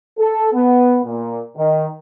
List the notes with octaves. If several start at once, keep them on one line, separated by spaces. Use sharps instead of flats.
A4
B3
A#2
D#3